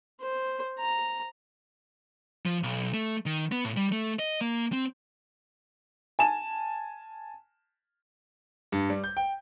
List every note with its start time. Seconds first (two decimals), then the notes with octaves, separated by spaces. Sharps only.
0.22 C5
0.79 A#5
2.46 F3
2.63 B1
2.94 A3
3.26 D#3
3.52 B3
3.65 A2
3.77 G3
3.92 A3
4.19 D#5
4.41 A#3
4.73 C4
6.19 G#5 A5 E7
8.72 G2
8.90 G3
9.04 G6
9.17 G5